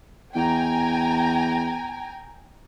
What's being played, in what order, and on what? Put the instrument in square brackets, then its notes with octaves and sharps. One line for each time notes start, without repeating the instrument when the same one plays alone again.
[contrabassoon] E2 [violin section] G5 G#5 A#5